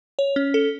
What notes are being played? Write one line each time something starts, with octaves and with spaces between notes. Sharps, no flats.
C#5
C#4
A4